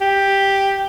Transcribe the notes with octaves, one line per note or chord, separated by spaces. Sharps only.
G4